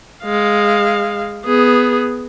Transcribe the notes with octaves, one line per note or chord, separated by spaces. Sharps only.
G#3 F5
B3 G#4